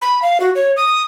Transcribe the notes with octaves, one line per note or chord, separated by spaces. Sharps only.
B5
F5
F#4
C#5
D#6